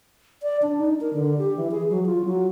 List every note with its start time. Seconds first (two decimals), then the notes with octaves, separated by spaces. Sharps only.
0.43 D5
0.62 D4
0.77 D#4
1.01 A#4
1.14 D3
1.38 G4
1.57 E3
1.71 G#4
1.90 F#3
2.06 F4
2.25 F#3